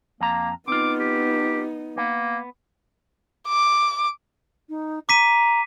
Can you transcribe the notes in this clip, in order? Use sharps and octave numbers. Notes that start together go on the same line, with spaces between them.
F2 A#3 A#5
B3 C4 D#4 F4 D6
G4
A#3 B3
D6
D#4
A#5 D6 B6 D#7